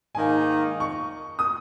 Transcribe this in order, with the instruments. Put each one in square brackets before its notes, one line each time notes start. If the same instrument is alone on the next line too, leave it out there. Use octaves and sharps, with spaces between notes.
[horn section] G#2 D#3 A#3 D#4 [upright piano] G#5
[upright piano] C#6
D#6